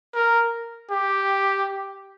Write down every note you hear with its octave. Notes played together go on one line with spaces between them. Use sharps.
A#4
G4